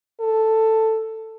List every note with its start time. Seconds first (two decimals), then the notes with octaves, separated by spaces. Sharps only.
0.21 A4